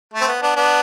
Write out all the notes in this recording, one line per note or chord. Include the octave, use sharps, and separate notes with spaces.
A3
C4
B3
B3 D4
B3 D4